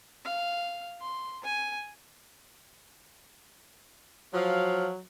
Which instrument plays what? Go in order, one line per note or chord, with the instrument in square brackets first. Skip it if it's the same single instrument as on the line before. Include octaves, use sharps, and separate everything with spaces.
[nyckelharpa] F5
C6
G#5
[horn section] F3 F5 [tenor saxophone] F#3